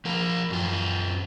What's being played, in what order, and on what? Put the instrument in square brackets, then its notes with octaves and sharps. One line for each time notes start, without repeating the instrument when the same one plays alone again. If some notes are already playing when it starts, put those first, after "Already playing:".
[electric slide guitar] F3 A#4 F5
F#2 F4